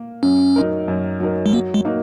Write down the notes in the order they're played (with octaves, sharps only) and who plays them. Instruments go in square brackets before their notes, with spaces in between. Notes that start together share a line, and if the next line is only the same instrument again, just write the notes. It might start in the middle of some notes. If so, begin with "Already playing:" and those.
Already playing: [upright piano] A#3
[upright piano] F#2 [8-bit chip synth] C#4
[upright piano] F#3 D#4 A#4
F#2
F#3 D#4 A#4
[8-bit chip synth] G#3
[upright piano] F#3 [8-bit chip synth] A#3
[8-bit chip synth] G#3
[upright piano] A#3 D#4 F#4 A#4